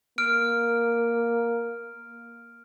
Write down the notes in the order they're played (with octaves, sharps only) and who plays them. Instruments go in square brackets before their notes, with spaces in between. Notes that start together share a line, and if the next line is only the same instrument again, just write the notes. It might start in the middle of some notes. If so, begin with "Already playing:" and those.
[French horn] A#3 [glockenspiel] F6 D7